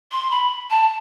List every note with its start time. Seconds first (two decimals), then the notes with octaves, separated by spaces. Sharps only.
0.11 C6
0.30 B5
0.70 A5